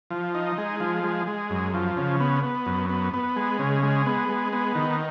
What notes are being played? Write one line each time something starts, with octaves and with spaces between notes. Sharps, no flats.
F3
D#4
G#3
F3
G#3
G#3
F#2
F3
C#3
B3
B3
F#2
B3
B3
G#3
C#3
G#3
B3
G#3
B3
D#3